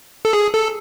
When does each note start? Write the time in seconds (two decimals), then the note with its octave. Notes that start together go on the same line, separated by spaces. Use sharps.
0.25 A4
0.33 G#4
0.53 A4